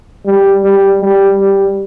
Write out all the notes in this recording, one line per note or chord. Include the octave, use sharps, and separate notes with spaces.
G3
G3
G3
G3